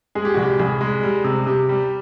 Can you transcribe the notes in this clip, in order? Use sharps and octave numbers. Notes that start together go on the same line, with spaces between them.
G#3 G#4
G4
C2 F#4
G4
C2 G#4
G#3
G3
C3
C3 G4
G3